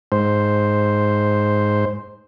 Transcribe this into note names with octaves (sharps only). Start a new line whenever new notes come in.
G#2 C5